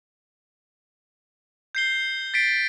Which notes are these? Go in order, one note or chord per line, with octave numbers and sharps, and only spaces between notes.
G6 C7 G7
A6 B6 C7 D7